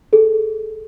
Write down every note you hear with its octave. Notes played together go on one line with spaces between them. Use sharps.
G#4 A4